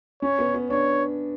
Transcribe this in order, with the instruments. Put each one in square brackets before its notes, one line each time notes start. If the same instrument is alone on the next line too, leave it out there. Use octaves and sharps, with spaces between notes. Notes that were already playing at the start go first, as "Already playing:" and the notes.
[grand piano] C#4 [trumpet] C#5
[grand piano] B3
B3
[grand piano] D4 [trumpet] C#5